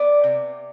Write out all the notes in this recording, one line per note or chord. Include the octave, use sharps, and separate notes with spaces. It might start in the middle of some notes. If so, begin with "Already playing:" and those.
Already playing: B3 D5
C3